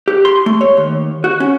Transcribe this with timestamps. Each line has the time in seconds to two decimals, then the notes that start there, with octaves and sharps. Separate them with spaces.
0.08 G4
0.25 C6
0.46 A3
0.61 C#5
0.77 D#2
1.24 F#4
1.40 C#4